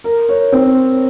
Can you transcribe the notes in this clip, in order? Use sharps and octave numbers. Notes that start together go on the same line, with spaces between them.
A#4
C#5
C4